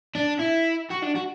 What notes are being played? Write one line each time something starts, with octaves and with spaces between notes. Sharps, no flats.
D4
E4
F#4
D4
F#4